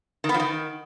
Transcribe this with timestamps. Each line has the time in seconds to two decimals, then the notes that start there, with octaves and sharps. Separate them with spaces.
0.24 D#3
0.29 B3
0.34 F3
0.40 D#3